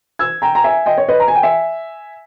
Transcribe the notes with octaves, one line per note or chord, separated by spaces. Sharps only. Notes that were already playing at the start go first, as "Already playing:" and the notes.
E6 G#6
G5 A#5
A#5
E5 G#5
D#5 G5
C#5
B4 D#5
A#5
G#5
G5
E5 G#5